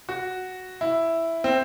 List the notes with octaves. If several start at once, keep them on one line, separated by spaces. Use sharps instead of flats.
F#4
E4
C4